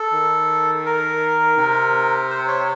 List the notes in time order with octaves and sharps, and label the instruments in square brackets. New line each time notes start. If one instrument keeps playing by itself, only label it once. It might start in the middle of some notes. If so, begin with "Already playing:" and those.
Already playing: [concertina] A4
[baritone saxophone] D#3
[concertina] A#4
[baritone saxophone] C3
[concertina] C5
C#5